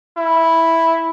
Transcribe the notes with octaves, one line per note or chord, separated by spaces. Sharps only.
E4